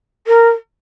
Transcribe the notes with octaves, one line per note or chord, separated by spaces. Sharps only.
A#4